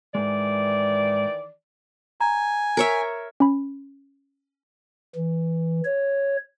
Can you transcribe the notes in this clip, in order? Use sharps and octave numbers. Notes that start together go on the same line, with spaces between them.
G#2 D#3 E3 G#3 D5
G#5 A#5
A#4 C#5 E5
C#4 B5
E3
C#5